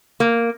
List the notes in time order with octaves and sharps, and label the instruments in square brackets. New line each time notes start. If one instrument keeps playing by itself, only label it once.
[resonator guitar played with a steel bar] A#3